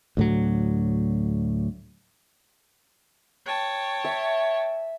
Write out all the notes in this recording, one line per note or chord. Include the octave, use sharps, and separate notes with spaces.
D2 A2 F#3
C#5 G5 A5
E5